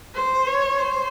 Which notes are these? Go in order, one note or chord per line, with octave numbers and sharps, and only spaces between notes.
C5
C#5
C5